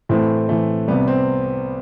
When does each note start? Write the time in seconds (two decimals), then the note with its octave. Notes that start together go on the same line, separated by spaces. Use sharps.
0.09 A2 E3 A3 C4
0.49 A2 E3 A3
0.88 C2 C3 G3 B3
1.08 C4